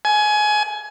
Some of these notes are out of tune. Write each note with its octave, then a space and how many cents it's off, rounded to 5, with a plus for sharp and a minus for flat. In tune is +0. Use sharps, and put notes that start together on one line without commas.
G#5 +20